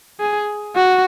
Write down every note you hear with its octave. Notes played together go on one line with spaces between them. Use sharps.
G#4
F#4